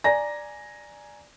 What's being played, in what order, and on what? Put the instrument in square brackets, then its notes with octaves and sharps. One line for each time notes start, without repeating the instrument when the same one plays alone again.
[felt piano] D5 G#5 A#5 A#6